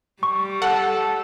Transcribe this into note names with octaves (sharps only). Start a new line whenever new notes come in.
G3 C#6
A4 F#5